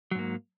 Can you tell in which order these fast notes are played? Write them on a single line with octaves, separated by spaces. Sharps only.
F#3 G#2 A#3